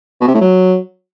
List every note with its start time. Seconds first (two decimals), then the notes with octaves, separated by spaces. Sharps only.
0.21 B2
0.28 C3
0.34 A2
0.41 F#3